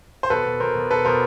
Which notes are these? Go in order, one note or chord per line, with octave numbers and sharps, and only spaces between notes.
C5
B2 A4 B4
B2
B2 A#4 C5
B2
B2 A4 B4
B2 A#4 C5